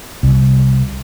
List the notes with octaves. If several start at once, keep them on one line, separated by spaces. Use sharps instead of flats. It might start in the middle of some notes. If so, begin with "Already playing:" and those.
C2